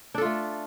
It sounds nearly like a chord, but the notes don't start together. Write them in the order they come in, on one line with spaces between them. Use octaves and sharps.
D4 A4 F4 A3